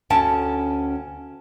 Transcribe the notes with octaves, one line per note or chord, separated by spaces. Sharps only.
D2 C#4 G5 A5